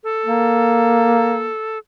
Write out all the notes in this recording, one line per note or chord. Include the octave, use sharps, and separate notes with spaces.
A4
A#3